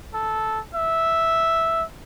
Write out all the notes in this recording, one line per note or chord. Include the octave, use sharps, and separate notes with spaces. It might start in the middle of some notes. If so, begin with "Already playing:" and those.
A4
E5